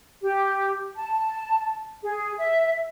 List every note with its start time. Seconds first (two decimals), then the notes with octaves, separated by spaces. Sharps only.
0.21 G4
0.96 A5
2.03 G#4
2.38 E5